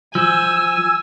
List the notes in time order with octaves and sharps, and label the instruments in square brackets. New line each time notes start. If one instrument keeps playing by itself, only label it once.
[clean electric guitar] F3 [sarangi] G#5 [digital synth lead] E6